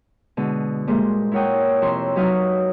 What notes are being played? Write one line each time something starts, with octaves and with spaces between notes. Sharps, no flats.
B2 D3 G#3
G2 A#2 G#3 A#3 C5
E4 A#4 C#5 F#5 G5 D#6
F2 C3 E4 C#5 A#5 C6
F#2 F#3 D#4 B4 F5 D#6